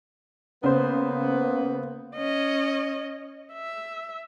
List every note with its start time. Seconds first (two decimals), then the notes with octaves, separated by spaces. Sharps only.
0.64 C#3 A#3 B3 C5
2.16 C#4 D#5
3.53 E5